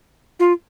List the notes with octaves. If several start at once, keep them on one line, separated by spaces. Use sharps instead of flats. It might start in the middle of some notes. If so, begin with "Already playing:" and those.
F4